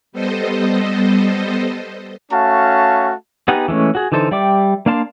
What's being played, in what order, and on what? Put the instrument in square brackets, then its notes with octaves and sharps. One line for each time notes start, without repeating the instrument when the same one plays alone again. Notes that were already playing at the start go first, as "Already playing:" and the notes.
[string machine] G3 B3 A4 C5 D#5
[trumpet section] A3 C#4 F#4 F5 A5
[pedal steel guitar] B3 D#4 G4 G#4 F#5
E3 G#3 A3 C#4
F#4 G#4
D3 E3 D#4 A4 C5
G3 D5 E5 G5 D6
A#3 D4 F5 A5 C6